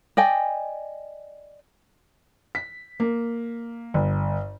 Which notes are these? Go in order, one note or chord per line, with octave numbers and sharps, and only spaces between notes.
D5 D#5 G5 G#5
B6
A#3
G1